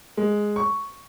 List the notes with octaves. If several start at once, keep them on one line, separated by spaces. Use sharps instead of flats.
G#3
C#6